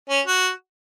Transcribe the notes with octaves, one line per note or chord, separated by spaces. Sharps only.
C#4
F#4